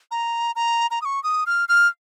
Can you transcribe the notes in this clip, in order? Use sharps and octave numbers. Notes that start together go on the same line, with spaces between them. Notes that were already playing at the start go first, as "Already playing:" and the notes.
A#5
A#5
A#5
D#6
C#6
D#6
F6
F6